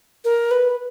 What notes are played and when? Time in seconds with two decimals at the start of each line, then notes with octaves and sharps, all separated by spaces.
0.24 A#4
0.51 B4